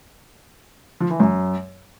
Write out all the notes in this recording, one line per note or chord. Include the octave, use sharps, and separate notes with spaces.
F3
E3
F#2